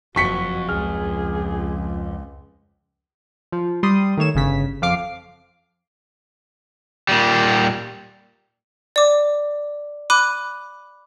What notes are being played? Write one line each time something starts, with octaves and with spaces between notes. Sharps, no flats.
F#1 F2 F#4 C#6 B6 C#7
C#2 G#4 F6
F3
G3 C6 D#6
D#3 A3 C#5 E7
G1 C#3 B6
F2 F5 D6 C7
A#2 G3
D5 D6
B5 D6 F#6 D#7